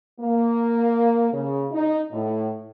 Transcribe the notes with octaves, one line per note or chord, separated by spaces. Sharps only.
A#3
C#3
D#4
A2